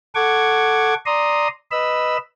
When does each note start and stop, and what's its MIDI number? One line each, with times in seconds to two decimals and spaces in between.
0.15 0.94 69
0.15 0.94 78
0.15 0.94 85
0.15 0.94 86
0.15 0.94 92
1.06 1.48 74
1.06 1.48 82
1.06 1.48 84
1.06 1.48 87
1.71 2.17 71
1.71 2.17 75
1.71 2.17 83
1.71 2.17 88